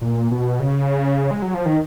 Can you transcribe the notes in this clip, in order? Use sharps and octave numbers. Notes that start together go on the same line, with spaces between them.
A#2
B2
C#3
G#3
F#3
F3
D#3